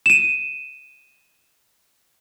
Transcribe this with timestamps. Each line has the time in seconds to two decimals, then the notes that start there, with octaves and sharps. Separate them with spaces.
0.06 D#7 E7